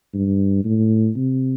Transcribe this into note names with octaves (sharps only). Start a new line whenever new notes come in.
G2
A2
C3